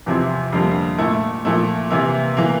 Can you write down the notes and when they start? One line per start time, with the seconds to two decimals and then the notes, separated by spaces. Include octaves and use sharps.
0.06 E2 C3 F3 C4 E4
0.53 F2 D3 G3 A#3
0.98 A#2 A3 E4
1.45 A#2 F3 A3 E4
1.90 C3 E3 A#3 E4
2.37 E3 A#3